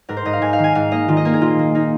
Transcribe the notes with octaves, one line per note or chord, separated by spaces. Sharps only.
G#2 A#4
C5
G#2 D#5
F5
G#2 G#5
F5
D#3
G#5
G#2 F5
A#3 D#5
D#3 F4
D#5
A#3 A#4
G#4
A#2 F4
A#3
A#3 D#4